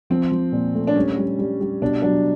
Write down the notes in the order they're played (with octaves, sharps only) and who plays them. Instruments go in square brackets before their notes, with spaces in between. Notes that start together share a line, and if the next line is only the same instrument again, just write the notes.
[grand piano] F3 [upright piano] C4
[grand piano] F3
A#2
A3
[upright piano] D4
[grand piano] G3 [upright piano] C#4
[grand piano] G3
G3
G3
[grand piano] B2 [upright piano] D4
[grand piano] F#3 [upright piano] D4